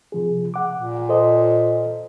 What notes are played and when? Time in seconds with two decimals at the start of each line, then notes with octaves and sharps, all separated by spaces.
0.12 C3 F3 G#4
0.54 F#5 D6
0.75 A#2
1.09 A4 C5 D#5